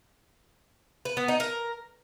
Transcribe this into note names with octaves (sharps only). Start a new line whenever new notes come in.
B4
B3
D#4
A#4